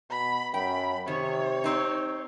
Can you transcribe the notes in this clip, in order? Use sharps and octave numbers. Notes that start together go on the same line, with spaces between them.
B2 B5
F#2 G5 B5
C3 D#3 C#5
C4 D#4